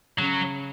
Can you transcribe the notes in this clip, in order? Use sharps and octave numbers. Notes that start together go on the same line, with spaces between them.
C#3 F#3